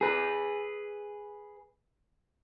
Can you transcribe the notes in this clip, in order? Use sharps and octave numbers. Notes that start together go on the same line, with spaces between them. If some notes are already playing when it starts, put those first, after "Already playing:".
G#4 B4